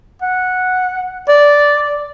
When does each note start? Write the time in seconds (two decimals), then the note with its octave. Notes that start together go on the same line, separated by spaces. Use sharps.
0.22 F#5
1.28 D5